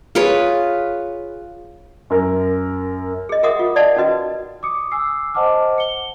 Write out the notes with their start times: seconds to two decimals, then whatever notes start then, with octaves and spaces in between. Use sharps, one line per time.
0.15 F4 G#4 B4 C#5
2.10 F#2 A#4
3.29 G#4 D#5
3.43 G#4 A#4 E5 F#5 D6 D#6
3.59 F4
3.76 D5 D#5 F5 F#5 A5
3.96 C#4 D#4 F#4 B4 D#5
4.63 D6 D#6 C#7
4.92 G#5 D6 E6 C7
5.34 C5 D#5 F#5 A5 D6 F6
5.78 C#7 G7